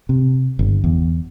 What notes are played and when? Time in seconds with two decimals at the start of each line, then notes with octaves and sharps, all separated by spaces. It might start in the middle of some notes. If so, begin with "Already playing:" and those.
0.09 C3
0.59 G1
0.84 E2